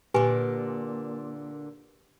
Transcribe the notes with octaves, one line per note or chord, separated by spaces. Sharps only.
A#2 D3 G4 B4 G#5